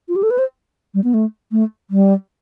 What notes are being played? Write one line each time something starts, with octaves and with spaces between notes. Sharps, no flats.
F4
G4
A4
B4
C5
G3
B3
A3
A3
G3